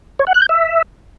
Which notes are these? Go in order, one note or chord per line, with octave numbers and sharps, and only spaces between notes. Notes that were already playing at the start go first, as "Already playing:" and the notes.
C#5
F#5
F#6
G6
E5